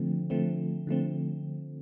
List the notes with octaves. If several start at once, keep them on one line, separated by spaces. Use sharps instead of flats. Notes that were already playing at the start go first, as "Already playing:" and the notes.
Already playing: D3 F3 A3 C4
D3 F3 A3 C4
D3 F3 A3 C4